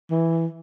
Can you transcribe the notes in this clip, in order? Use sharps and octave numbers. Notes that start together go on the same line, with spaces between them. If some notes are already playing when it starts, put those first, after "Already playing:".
E3